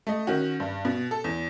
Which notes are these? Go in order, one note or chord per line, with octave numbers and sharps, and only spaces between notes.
A3 D#5
D#3 C#4 F#4
G2
B2
A4
E2